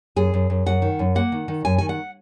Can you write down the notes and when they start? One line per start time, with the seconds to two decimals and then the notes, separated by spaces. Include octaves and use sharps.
0.16 F#2 G#4
0.34 F#2
0.50 F#2
0.66 F#2 F#5
0.82 D#3
0.99 F#2
1.15 A#3 F#5
1.32 D#3
1.48 D#3
1.65 F#2 G#5
1.78 D#3 G#5
1.89 F#5